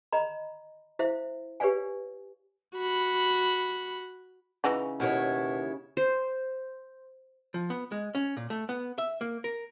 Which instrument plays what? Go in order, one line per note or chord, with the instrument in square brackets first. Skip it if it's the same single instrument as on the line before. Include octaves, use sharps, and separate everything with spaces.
[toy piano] D#5 A#5 B5
E4 C5 E5 F5
G4 B4 C#5 D5 F5 G#5
[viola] F#4 B5
[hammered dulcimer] C#3 [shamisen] E3 D#4 F#4
[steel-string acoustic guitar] D#2 E4 C#5 [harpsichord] B2 [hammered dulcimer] C#6
[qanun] C5
[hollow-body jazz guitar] F3
B3
G#3
C#4
A#2
A3
B3
E5
A#3
A#4